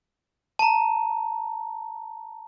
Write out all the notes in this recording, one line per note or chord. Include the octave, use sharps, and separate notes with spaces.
A5 A#5